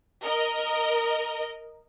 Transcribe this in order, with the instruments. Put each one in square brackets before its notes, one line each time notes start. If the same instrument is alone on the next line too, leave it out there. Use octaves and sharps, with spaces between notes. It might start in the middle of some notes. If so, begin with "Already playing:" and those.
[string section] A#4 D#5